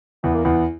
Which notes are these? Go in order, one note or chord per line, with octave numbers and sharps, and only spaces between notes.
E2 B3
A#3
E2 B3